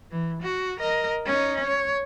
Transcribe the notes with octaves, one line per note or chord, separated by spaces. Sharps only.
E3
F#4
A#4 D#5
C#4 D#4
C#5